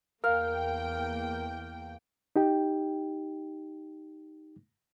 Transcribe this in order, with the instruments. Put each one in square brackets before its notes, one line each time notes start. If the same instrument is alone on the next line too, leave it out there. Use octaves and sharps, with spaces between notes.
[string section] E2 A#3 G5 [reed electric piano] A#4 [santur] F5
[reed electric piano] D#4 G4 G5